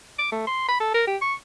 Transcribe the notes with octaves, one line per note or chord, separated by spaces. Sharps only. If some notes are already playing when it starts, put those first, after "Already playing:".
D6
A3
C6
B5
A4
A#4
G4
C#6